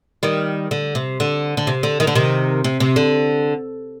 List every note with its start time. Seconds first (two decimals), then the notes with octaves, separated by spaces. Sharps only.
0.23 D#3 G3
0.71 D3
0.95 C3
1.20 D3
1.57 D3
1.67 C3
1.83 D3
2.00 D#3
2.07 D3
2.15 C3 D#3
2.64 C3
2.80 C3
2.96 D3